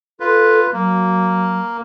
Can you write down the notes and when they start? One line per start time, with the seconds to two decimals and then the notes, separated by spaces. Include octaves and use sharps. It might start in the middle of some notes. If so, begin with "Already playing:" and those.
0.20 F4 A4 B4
0.73 F#3 A#3